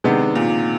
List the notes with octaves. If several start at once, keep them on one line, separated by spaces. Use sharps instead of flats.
C3 D#3 G#3 B3 D4
A#2